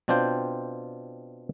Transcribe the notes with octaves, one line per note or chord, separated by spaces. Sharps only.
B2 C4 D4 F4 C5 G5